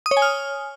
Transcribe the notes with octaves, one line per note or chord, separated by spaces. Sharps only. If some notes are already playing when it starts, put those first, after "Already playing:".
D#6
C#5
G#5
F6